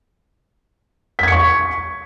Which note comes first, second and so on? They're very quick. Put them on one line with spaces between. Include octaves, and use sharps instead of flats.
B6 G#6 C#7 C#6